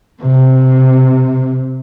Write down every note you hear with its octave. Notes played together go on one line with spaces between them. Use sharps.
C3